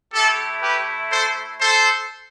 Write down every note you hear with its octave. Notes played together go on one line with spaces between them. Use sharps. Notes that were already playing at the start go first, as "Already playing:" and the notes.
A3 E4 G4 A4
G4 B4
A4 C5
A4 C5